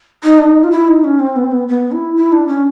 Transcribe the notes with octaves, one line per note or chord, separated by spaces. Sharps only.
D#4
D4
D#4
F4
E4
D#4
C#4
C4
B3
C4
B3
B3
E4
E4
D4
C#4